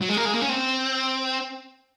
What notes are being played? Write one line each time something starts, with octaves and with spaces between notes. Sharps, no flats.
F#3
G#3
A#3
G#3
A#3
C#4
C4